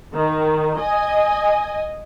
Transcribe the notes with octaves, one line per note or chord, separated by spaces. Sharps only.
D#3
D#5 G#5